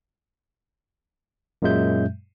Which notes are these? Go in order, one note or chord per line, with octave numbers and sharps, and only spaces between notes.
F#2 A#2 F#3 G#3 E5 G6